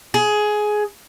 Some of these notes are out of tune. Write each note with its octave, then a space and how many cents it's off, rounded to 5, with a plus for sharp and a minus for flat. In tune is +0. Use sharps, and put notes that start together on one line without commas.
G#4 +15